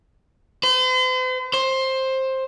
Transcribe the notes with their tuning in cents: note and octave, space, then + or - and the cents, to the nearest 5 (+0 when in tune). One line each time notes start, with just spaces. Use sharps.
C5 -45
C5 +15